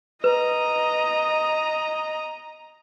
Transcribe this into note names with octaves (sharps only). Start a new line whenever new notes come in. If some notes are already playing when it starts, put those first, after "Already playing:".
B4 D#5 A#5